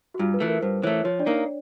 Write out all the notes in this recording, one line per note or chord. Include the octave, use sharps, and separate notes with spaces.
F#4
G2 F4
B4
E3 A3
A#4
G2 C5
E3 A3 C#5
F3 C#5
D4 D5
A#3 D#4